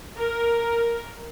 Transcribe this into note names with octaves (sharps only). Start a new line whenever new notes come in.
A#4